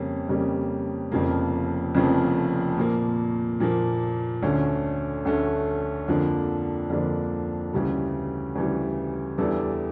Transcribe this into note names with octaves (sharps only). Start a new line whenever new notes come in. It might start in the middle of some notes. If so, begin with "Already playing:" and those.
Already playing: F2 C#3 G3 A#3 C#4
F2 C#3 G3 A#3 C#4
F1 F2 C#3 F3 A#3
F1 F2 C#3 F3 A#3
A#2 F3 A#3
A#2 F3 A#3
D2 D3 A3 C#4
D2 D3 A3 C#4
F2 D3 F3 A#3 D4
F2 D3 F3 A#3 D4
D2 C#3 E3 G3
D2 C#3 E3 G3
E2 E3 G3 D4 A4